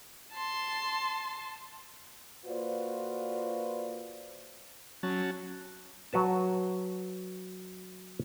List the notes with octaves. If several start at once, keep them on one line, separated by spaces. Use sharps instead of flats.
A5 C6
A#3 F4 F#4 B4 C5 D5
F#3 C#4 F#4 A5
F#3 F#4 B4 A5